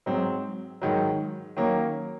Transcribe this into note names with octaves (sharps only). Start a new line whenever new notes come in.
G#2 F#3 C4
G#2 D#3 F#3
D#3 F#3 A#3 C#4